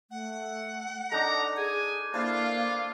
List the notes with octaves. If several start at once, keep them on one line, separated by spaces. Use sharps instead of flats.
A3 F#5
D4 D#4 A4 D#5 A#5
G#4 G#5
A#3 D4 E4 F4 C5 F5